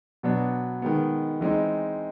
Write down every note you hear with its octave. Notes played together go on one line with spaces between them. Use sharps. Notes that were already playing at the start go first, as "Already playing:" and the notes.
B2 F#3 B3 D4
D#3 G#3 B3
E3 G#3 C4 D#4